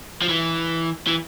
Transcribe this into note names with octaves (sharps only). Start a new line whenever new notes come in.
F3
E3
E3